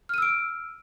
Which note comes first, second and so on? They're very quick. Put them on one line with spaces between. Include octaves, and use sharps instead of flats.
F6 D#7 E6 D7